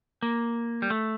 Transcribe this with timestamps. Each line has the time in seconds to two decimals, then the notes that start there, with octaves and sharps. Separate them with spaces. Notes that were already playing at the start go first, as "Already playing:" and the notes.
0.23 A#3
0.82 G3
0.90 A3